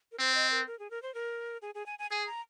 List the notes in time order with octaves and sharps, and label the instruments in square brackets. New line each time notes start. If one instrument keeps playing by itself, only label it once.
[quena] A#4
[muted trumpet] C4 [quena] C5
[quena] D#5
A#4
A#4
G#4
A#4
C5
A#4
G#4
G#4
G#5
G#5
[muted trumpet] G#4 [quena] G#5
[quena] A#5